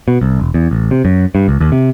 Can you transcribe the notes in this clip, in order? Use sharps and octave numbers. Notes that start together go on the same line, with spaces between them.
B2
C2
E1
E2
A1
C3
F#2
G2
C#2
D#2
C3